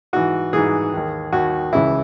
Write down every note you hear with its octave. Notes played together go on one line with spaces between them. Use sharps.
G#2 E3 F#4
G#2 E3 G#4
D#2 D#3
D#2 D#3 F#4
C#2 C#3 E3 E4